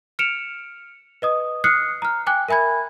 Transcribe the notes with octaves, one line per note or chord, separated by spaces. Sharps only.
F6 C#7 D7 E7 F7
B4 D#5 D#6
D#6 F6 F#6 C7 C#7
A#5 F6
G5 G#5 D6 F#6
A#4 E5 G#5 B5 G#6